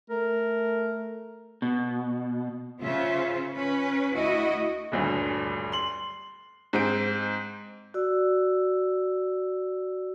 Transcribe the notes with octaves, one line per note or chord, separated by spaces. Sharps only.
A3 A#4
B2
C#3 C#4 F4 C5 E5
C#4 B4
D2 E4 F#4 D#5
D#1 D2 G2
C6 F#7
G#2 C4 D7
F#4 D5 E6